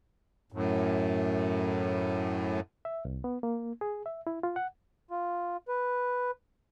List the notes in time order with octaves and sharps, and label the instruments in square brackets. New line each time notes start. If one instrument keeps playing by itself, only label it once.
[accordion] F#2 A2
[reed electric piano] E5
C2
B3
A#3
G#4
E5
E4
F4
F#5
[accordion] F4
B4